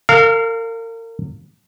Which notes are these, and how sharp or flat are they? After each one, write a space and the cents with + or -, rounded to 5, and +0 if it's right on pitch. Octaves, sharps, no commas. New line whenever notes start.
A#4 -35 F5 +0